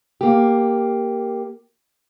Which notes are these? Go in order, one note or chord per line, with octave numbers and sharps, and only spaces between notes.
A#3 G4